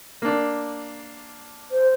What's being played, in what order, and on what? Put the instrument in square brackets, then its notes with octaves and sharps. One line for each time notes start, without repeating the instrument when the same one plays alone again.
[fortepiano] A#3 D4
[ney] C5